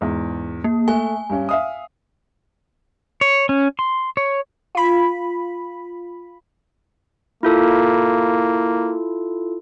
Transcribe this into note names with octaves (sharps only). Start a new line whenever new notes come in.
E2 G#2
A#3
A3 G#5
G2 C#4
E5 F5 D#6
C#5
C#4
C6
C#5
F4 B5
A#3 E4 F4 A4